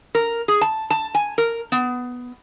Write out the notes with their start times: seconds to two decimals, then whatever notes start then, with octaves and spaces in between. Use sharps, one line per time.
0.15 A#4
0.48 G#4
0.61 A5
0.90 A5
1.15 G#5
1.38 A#4
1.72 B3